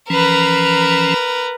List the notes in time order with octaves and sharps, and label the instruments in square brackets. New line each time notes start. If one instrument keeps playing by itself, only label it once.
[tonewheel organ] E3 F3 C#4 [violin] A#4 B4